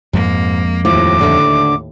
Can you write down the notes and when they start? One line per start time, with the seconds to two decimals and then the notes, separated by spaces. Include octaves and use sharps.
0.13 F2 G#2 G#3 A#3
0.85 D#2 A2 E4 F4 C5 D6
1.19 D2 D3 E5